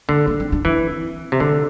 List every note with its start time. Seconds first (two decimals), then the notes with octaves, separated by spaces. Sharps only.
0.08 D3 A#3
0.27 A#3
0.40 C4
0.52 D4
0.65 E3 C4
1.32 C3
1.40 D3 A3